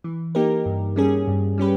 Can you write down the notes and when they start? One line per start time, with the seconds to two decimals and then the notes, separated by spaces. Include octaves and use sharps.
0.04 E3
0.35 A#3 D#4 G4 A#4
0.66 G2
0.96 G3 C#4 G#4
1.27 G2
1.58 G3 C#4 G4 B4